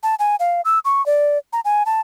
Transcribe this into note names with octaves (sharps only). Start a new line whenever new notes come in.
A5
G#5
F5
E6
C#6
D5
A#5
G#5
A5